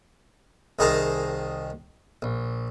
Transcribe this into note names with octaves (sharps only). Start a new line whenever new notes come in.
C2 D#3 G#4 C5 A5 A#5
A#1